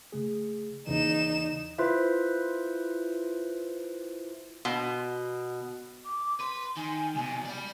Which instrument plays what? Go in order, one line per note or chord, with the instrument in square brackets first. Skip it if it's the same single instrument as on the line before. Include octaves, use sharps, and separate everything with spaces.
[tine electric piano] C#3 A3 G#4
[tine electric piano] D#2 C#3 E3 [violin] D#4 E7
[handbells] E4 F4 B4 C5 E5
[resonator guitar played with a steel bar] B2
[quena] D6
[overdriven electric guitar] B4 [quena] C6
[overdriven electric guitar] D#3 [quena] G#5
[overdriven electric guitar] C2 B2
D5 B5